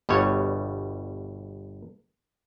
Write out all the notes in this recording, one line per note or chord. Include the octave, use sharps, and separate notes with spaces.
G1 B2 G3 C#5